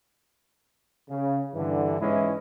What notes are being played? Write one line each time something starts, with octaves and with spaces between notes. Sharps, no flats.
C#3
G2 D3 E3
E2 G#2 E3 G#3 C#4 E4